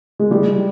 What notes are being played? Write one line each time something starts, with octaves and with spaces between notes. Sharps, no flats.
G#3
G3